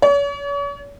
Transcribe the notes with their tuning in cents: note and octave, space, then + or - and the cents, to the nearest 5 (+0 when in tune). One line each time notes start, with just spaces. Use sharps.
C#5 +40